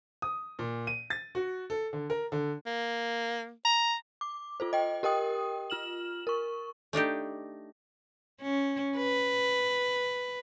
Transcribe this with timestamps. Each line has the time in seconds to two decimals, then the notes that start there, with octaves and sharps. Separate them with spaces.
0.22 D#6
0.59 A#2
0.87 D#7
1.10 A6
1.35 F#4
1.70 A4
1.93 D3
2.10 A#4
2.32 D3
2.66 A#3
3.65 A#5
4.21 D6
4.60 F4 A4 C5
4.73 D#5 G5
5.03 G4 A#4 D#5 G5 D#6
5.70 F4 F6 E7 F#7
6.27 A#4 C#6
6.93 A3 D4 D#4 G4
8.42 C#4
8.97 B4